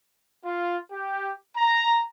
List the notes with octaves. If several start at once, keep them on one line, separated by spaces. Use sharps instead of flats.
F4
G4
A#5